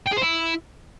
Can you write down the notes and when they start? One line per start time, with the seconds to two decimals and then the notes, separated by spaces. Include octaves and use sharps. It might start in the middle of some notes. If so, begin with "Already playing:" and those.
0.07 G5
0.12 G#4
0.18 C5
0.23 E4